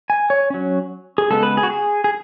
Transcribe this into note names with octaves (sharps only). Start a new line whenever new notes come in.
G#5
C#5
F#3 C#4
G#4
C#3 G#3 B3 A4
B4
G#4
F#4
G#4
G#4